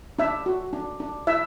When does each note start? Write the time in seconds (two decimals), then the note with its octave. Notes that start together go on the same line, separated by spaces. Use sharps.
0.19 D4 E5
0.46 F#4
0.73 D4
1.00 D4
1.27 E4 E5